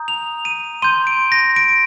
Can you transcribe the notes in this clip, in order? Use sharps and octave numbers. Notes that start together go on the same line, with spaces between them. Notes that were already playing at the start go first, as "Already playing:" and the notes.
Already playing: A#5 D#6 G6
F7
D#7
C6 G6 D#7
D7
A#6
D7